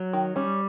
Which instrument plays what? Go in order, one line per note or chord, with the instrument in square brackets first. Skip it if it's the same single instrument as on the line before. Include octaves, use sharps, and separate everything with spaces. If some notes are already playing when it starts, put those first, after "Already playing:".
Already playing: [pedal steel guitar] F#3
[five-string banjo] D#3
[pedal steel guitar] G3 [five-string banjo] C#4